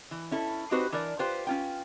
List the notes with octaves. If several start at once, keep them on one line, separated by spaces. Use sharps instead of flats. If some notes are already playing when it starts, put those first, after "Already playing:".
E3
C#4 E4 A4
C4 D#4 F#4 G4 B4 C5
E3 D4 A#4 D5
F4 G4 B4 C5
C#4 F4 G5